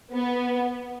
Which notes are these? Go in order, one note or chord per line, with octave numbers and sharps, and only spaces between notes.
B3